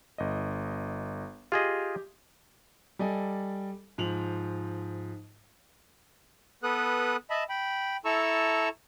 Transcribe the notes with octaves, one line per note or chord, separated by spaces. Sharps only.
G1 D#5
F4 G4 G#4 D#5
G3 A4 D5 D#5 G#5
G#2 F3 F7 F#7
B3 A4 B4 D#6 F#6
D#5 E5 A5 B5
G5 B5
E4 A4 A5 A#5 C#6 E6